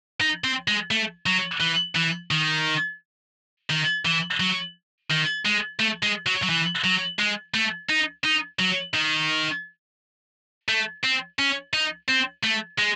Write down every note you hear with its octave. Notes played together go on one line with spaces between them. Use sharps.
D#4
C4
G#3
A3
F#3
E3
E3
D#3
D#3
E3
F#3
D#3
G#3
A3
G#3
F#3
F#3
E3
F#3
G#3
A3
D#4
D#4
F#3
D#3
A3
C4
C#4
D#4
C4
A3
G#3